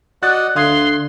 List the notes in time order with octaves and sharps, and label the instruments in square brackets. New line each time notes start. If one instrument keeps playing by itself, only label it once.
[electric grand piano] F#4 F#6 A6 [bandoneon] D5 D#5 F#5
[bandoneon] D2 [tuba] D3 [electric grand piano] F5 D#6 G#6 [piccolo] C6